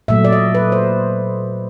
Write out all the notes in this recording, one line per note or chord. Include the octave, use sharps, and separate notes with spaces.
A#2 F#3 A3 E5
D5
D#5
B4
C5